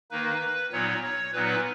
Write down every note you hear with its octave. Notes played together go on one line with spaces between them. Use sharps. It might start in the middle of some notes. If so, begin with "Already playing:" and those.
D#3 A#3 D#4 B4
A#2 F#3 B3 D#4 C#5
C#5
A#2 F#3 B3 D#4 B4